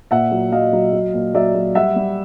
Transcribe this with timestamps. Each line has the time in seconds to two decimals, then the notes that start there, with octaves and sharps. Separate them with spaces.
0.11 A#2 E5 F#5
0.32 F#3
0.52 F#3 D#5 F5
0.73 F#3
0.93 F#3
1.14 A#2
1.34 F#3 D5 E5
1.55 F#3
1.75 G3 E5 F#5
1.96 G3